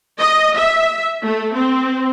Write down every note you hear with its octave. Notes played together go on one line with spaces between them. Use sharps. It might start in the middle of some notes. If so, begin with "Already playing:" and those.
D#5
E5
A3
C4